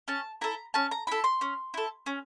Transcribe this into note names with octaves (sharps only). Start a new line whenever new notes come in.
C#4 A5
E4 A4 A#5
C#4 A5
A#5
E4 A4 B5
C6
C#4
E4 A4
C#4